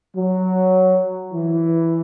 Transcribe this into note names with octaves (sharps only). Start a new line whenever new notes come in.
F#3
E3